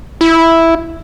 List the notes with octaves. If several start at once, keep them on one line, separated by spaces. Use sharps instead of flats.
E4